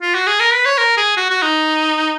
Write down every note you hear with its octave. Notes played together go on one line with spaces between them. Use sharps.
F4
F#4
G#4
A#4
B4
C#5
A#4
G#4
F#4
F#4
D#4